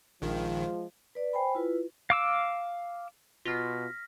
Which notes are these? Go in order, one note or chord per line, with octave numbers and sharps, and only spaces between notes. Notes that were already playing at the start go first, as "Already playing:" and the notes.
A#1 D#3 F3 G#3 F4
B4 D5
C5 G5 G#5 B5
E4 F4 B4
F5 D6 E6
B2 F4 F6 A#6 B6